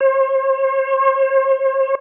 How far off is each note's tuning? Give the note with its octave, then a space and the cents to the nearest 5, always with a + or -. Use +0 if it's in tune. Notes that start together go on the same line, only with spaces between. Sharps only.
C5 +45